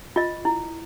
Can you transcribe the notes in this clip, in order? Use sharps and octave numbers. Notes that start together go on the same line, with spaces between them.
F4 D#5
E4